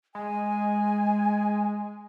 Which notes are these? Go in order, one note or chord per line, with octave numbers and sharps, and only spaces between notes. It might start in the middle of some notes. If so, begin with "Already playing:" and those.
G#3 G#5